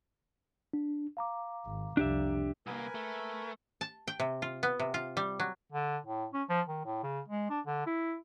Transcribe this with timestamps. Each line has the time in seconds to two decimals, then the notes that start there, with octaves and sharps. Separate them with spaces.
0.73 D4
1.17 F5 A#5 D6
1.66 G#1
1.97 C2 F2 D4 G4 E5
2.67 C2 A#3 A#4 B4 G#5
2.95 A3
3.81 A5
4.08 G5
4.20 C3
4.42 F4
4.63 B3
4.80 C3
4.94 F4
5.17 G3
5.40 F#3
5.72 D3
6.06 A2
6.33 C#4
6.49 F3
6.68 D#3
6.85 A2
7.03 C#3
7.28 G#3
7.50 D4
7.67 D3
7.86 E4